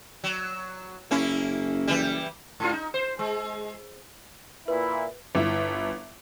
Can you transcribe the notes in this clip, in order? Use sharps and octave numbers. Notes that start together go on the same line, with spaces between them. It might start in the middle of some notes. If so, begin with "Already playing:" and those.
F#3
F#1 A#3 C#4 E4
E3 G3
G#2 F4
D#4
C5
G#3
A#2 E4 B4
G1 E4 E5